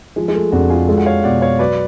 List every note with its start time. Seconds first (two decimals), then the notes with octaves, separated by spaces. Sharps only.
0.16 F3 G#3
0.28 G#3
0.35 A3
0.52 F2 D4 F#4
0.70 F4 G#4
0.88 G#3 F#4 A4
0.98 F#5
1.06 C#5 F5
1.24 B2 D5 F#5
1.42 C#5 F5
1.59 F#3 B4 D5